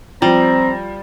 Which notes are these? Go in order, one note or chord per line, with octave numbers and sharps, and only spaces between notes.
F3 G3 C4 A#5